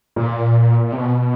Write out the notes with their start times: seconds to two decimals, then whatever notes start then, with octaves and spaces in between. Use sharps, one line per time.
0.16 A#2
0.92 C3
0.98 B2